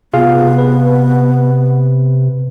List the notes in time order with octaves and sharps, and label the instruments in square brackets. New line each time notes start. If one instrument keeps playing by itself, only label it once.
[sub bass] C3 [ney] B3 [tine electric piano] F4 G#4 F5
[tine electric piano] B4